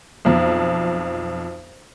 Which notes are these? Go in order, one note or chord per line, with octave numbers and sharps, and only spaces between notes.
B1 F2